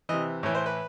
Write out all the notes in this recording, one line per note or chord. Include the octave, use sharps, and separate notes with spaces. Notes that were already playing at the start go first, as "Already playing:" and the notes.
C3 E3 D#5
A2 E3 C#5
C5
B4